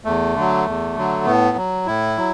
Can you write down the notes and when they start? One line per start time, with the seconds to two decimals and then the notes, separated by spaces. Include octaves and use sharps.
0.05 E2 A3
0.35 D3 F#3
0.66 E2
0.96 D3 F#3
1.26 A2 B3
1.57 F#3
1.86 A2 E4
2.17 F#3